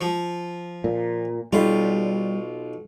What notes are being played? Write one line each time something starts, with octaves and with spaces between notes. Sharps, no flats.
F3
A#2
B1 G3 F4